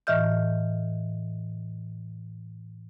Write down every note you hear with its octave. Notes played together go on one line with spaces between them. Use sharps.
A2 E3 D#5 E5 F6 G6